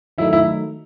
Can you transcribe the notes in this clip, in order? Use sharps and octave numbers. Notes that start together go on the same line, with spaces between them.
D#3 F#3 A3 D#4 E4
E4